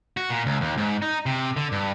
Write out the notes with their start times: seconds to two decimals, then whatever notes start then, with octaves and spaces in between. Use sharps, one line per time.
0.17 F#4
0.30 A#2
0.46 C#2
0.61 D#2
0.78 G#2
1.02 D#4
1.26 C3
1.57 D3
1.72 G2